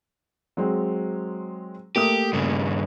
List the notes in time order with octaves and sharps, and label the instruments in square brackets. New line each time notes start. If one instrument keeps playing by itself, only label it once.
[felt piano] F#3 G#3 C4
[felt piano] A3 A#3 D#6 [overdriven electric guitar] G4
[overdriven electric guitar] G2 C#3